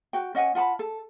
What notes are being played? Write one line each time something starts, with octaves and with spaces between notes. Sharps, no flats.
F#4 G5
C#4 D#5 F#5 G#5
F4 F#5 A5 B5
A4